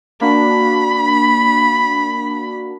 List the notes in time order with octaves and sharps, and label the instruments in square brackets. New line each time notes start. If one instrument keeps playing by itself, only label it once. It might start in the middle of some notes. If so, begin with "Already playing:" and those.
[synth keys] A#3 D4 F#4 [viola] B5